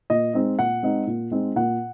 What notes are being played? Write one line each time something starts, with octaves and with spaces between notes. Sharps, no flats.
A#2 D#5
G#3 C4 D#4
A#2 F#5
G#3 C4 D#4
A#2
G#3 C4 D#4
A#2 F#5